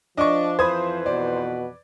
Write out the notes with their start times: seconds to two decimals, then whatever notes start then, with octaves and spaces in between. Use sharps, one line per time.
0.17 F3 D4 D#5 C#6
0.59 F2 E3 B4 C5 B5 D#6 G#6
1.06 B2 D5